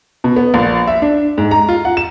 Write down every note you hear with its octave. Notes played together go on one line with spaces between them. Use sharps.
B2
B3
A#1
E5
D4
G#2
A#5
F4
F#5
E7